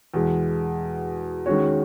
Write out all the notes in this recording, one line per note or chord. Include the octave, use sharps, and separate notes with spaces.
E2 B2 G#3
D#3 G#3 C#4 F#4 C#5